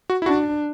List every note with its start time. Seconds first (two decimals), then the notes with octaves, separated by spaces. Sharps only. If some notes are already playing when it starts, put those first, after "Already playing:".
0.10 F#4
0.22 E4
0.26 D4 F#4